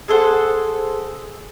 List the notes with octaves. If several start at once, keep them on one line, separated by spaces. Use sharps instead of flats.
G#4 A4 C5 F#5